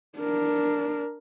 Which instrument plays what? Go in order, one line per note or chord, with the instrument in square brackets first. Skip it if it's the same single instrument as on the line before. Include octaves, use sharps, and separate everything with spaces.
[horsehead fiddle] D4 A#4